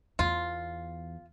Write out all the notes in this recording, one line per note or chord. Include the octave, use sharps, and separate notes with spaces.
E2 F4